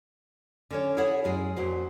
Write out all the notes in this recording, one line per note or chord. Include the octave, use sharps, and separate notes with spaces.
D3 C#4 C#5
E4 G#4 A4 C#5 F#5
F#2 G#3 G#4
F2 A#2 F#4 C5